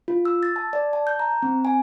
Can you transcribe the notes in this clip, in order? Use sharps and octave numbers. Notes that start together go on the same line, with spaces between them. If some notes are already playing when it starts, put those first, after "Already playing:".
F4
E6
A6
A5
D5
A5
G6
A#5
C4
G#5